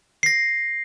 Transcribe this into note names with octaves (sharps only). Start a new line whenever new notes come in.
A#6 C7